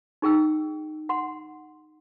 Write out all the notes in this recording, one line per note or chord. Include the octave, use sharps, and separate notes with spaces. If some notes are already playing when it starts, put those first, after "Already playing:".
D#4 G#4 G5 E6
F#5 C6